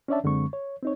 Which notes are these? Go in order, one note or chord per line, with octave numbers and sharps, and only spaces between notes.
C#4 D4 C#5 D5 E5 A5
F#2 D3 G#3 C4 C#6
C#5
C4 D#4 C#5